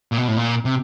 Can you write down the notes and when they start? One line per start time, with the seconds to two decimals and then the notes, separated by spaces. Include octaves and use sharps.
0.12 A#2
0.18 B2
0.28 A2
0.37 A#2
0.65 C3